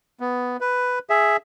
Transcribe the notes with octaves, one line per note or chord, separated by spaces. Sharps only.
B3
B4
G#4 E5